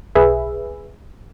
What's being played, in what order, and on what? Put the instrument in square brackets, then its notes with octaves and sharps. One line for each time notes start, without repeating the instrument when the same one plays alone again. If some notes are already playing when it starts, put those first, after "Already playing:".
[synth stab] B1 G#4 B4 E5